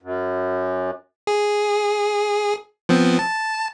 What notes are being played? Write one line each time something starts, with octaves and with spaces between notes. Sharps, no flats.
F#2
G#4
F3 B3 C4
A5